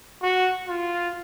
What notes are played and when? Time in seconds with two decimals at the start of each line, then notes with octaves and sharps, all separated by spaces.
0.22 F#4
0.68 F4